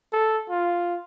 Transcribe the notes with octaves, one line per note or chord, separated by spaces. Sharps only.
A4
F4